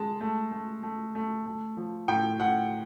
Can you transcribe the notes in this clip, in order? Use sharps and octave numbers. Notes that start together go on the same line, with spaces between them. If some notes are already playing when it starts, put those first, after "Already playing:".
Already playing: G#3 A5
A3
A3
A3
A3
A3
F3
A2 G5
A2 F#5